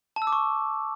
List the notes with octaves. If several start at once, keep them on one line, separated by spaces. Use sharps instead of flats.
A5
E6
D6
C#6